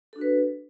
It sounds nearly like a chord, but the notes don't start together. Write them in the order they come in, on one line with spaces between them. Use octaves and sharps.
A4 D4 F#4 B4